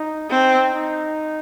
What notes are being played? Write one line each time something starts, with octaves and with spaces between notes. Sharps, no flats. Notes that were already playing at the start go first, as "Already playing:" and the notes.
Already playing: D#4
C4 D#4
D#4